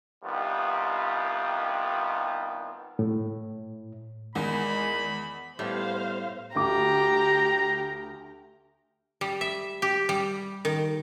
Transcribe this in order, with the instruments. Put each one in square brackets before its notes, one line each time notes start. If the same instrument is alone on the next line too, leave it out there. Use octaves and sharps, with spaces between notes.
[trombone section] C2 D#3 G3 B3 F4
[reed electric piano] A2
[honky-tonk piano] E2 [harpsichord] D#3 [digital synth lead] G#3 [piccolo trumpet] B5
[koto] A2 [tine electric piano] G3 B3 [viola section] C5 F5
[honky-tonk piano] D2 D6 [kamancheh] G4 [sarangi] A#5
[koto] G3
E5
G4
G3
D#3